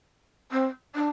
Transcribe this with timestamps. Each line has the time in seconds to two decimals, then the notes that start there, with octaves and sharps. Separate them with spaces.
0.51 C4
0.95 D4